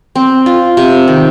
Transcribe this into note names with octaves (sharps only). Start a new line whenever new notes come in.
C4
F4
C3
D#3